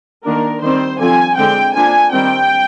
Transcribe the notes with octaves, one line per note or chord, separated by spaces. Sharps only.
D#3 A#3 D4 A#4
D#3 G3 C4 C5
D3 F3 C4 G#5
D3 G#3 C4 G5
F3 A#3 D4 G#5
D#3 G3 C4 G5